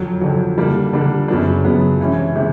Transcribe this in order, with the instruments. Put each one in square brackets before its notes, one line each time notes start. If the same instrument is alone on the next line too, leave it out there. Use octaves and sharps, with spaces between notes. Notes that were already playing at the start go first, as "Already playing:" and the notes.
Already playing: [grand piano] F2 D3 F#3
F2 D3 F#3
D3 G3 A#3 D4
D3 G3 A#3 D4
F#2 C#3 F#3 B3 D4
F#2 C#3 F#3 B3 D4
C3 E3 G#3 C#4
C3 E3 G#3